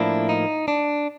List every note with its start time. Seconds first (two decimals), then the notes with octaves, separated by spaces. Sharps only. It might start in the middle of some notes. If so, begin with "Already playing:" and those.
Already playing: A2 F3 A#3 D4 E4
0.29 D#4
0.68 D4